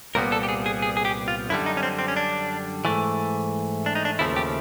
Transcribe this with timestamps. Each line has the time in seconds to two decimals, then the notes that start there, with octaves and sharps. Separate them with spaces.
0.15 C2 A#2 G3 B3 A#4
0.32 A4
0.43 G4
0.49 G#4
0.66 G#4
0.82 G#4
0.97 G#4
1.05 G4
1.28 F4
1.49 F#2 D3 G3 E4
1.66 D#4
1.77 C#4
1.83 C4
1.99 C4
2.08 C#4
2.16 D4
2.85 G#2 E3 A3
3.86 D4
3.95 D#4
4.05 D4
4.19 D#2 C#3 F3 A3 E4
4.36 G4